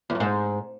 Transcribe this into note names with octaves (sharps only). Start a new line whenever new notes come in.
E2
F#2
G#2